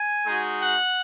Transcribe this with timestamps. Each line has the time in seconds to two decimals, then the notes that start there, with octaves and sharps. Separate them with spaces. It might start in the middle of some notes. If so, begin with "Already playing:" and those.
Already playing: G#5
0.26 G#3 D#4 F#4
0.62 F#5